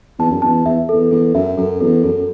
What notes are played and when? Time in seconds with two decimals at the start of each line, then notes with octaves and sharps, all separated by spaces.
0.19 E2 A5
0.31 F#2
0.42 E2 A5
0.66 E2 E5
0.89 E2 A4
1.11 E2 A4
1.35 F#2 E5
1.58 F#2 A4
1.80 E2 A4
2.04 F#2 A4